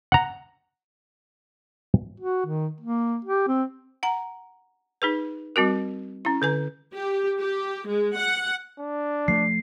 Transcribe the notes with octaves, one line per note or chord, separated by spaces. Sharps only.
F#5 A#5
F#4
D#3
A#3
G4
C4
F#5 A#5
D#4 G#4 B4
G3 C4 F#4 A#4
C#4 E4
D3 B4 G#5
G4
G4
G#3
F#5
D4
F3 A3 C7